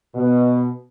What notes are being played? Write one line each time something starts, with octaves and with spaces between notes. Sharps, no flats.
B2